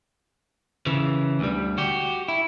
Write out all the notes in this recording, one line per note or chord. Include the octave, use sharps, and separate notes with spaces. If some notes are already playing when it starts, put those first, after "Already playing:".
C#3 E3
D2 G3
F#4 G4
E4